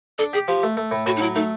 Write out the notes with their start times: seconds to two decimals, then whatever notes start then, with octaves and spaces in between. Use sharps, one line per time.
0.18 D4 A4
0.33 G4 G#4
0.48 F3 G4
0.63 A3
0.77 A3
0.91 A2
1.06 A2 F#4
1.16 D#4
1.21 F#3 E4
1.35 A3 D#4